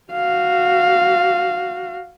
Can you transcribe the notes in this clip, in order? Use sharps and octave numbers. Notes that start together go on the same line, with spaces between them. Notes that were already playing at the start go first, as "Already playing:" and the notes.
F#4 F5